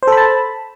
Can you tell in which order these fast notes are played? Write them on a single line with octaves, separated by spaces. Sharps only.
C5 A4 B5 A5